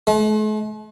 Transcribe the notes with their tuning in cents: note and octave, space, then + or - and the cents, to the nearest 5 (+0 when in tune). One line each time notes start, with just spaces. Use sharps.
A3 -45